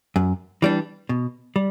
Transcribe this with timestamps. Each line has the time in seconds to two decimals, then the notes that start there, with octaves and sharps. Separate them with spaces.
0.16 F#2
0.62 E3 G3 D4
1.09 B2
1.56 G3